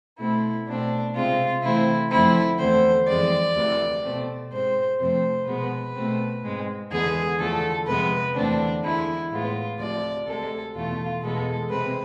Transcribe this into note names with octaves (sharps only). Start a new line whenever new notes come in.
B2 A3 C4 E4
B2 A3 C4 D4
C3 G#3 C4 F4
C3 E3 A3 C4 E4
F2 D3 F3 A3 C4 E4
E2 D3 A3 C4 C5
F2 E3 G#3 C4 D5
D2 C3 E3
B2 A3 C4
G#2 G#3 C4 C5
F2 C3 F3 A3 C4 C5
B2 G#3 B3 B4
B2 A3 C4
G#2 G#3 C4
E2 D3 G#3 B3 G#4
E2 D3 F3 A3 A4
F2 C3 G#3 B3 B4
E2 D3 A3 C4 D4
E2 D3 G#3 E4
A2 G#3 B3 F4
D2 C3 F3 D5
D2 C3 G#3 A4
E2 B2 A3 F4
E2 B2 G#3 B3 A4
C3 G#3 C4 B4